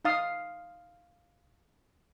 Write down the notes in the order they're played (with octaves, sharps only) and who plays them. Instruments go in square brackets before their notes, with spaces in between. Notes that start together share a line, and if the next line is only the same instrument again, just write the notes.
[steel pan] D#4 F5 D#6